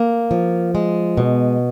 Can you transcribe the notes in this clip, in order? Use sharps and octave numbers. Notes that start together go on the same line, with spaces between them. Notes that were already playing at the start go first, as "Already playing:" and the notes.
Already playing: A#3
F3
G#3
B2